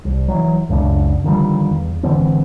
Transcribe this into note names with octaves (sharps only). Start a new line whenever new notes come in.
C2
E3 F#3
C#2 F#2 C#3 D4
D3 D#3 F3 G3
E2
G#1 D3 E3 C4